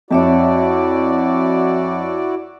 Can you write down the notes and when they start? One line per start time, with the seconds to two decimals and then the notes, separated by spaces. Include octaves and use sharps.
0.11 F2 E4 F#4 C#5 D5 E5 A5